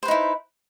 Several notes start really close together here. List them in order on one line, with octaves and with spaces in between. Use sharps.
C5 B4 D#4 E4